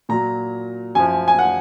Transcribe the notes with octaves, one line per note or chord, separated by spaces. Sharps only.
A#2 F#3 A#5
F#2 F3 G#5
G#5
F#5